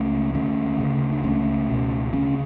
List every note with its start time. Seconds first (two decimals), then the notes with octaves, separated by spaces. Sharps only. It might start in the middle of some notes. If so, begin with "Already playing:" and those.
Already playing: C#2 C#3 A3 C#4
0.34 D2 D3 A3 C#4
0.79 D2 C#3
1.12 D4
1.24 C#2 C#3 A3 C#4
1.68 C#2 B2
2.13 C#3 A3 C#4
2.16 D2